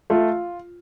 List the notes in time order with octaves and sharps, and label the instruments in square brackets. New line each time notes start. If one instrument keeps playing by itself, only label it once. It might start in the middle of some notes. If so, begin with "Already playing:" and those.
[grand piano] A3 [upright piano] F4